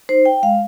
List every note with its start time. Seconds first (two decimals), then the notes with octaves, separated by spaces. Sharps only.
0.09 D#4 C5
0.25 G5
0.43 G#3 F5